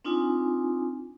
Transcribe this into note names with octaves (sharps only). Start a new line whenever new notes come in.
C4 D4 D#4 F4 G#5